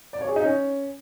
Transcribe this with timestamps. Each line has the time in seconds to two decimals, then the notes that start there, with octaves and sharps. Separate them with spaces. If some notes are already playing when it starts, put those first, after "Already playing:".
0.13 D5
0.21 C#5
0.29 G#4
0.36 D#4
0.44 C#4